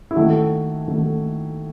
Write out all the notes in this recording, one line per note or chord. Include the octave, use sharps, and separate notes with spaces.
E4
D#3 A3 F#4
D#3 A3 F#4